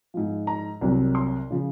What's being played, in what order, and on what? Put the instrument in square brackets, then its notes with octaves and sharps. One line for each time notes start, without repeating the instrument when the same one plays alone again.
[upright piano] G#2 F3
A#5
C2 C3 F#3
C6
C#3 F3